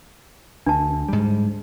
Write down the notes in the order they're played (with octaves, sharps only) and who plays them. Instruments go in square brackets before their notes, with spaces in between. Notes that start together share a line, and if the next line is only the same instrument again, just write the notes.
[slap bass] D2 [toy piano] D4 A5
[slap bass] G#2 G3